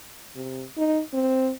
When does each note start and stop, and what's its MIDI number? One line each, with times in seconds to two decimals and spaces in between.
0.36 0.64 48
0.77 1.01 63
1.14 1.51 60